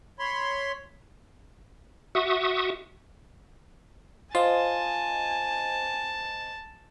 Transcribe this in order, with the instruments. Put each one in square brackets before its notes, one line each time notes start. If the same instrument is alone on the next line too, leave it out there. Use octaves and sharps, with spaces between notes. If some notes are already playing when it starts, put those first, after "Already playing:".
[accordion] C#5 B5 C6
[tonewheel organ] F#4 E5 C#6 D#6
[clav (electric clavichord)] F4 [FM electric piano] C5 D#5 [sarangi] G#5 [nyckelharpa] A5